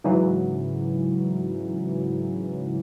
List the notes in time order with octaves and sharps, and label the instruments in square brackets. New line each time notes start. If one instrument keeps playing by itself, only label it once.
[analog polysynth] G#2 C#3 E3 F#3